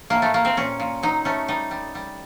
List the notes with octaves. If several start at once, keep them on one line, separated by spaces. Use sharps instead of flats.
A2 A#3
A3
A3 A#3
C4
A#2 C#4
A#2
F#3 D#4
A3 C#4
G3 D#4
G3
G3